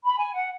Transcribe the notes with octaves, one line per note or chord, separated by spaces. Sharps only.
B5
G#5
F#5